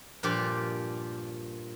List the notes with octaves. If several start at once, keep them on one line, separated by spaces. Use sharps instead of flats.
G2 A#2 F3 F4 G4 F5